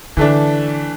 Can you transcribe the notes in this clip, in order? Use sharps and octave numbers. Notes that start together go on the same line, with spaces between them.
D3 E3 A3 D4